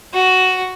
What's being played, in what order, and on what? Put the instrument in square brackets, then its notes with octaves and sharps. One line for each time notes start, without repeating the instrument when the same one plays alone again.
[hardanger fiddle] F#4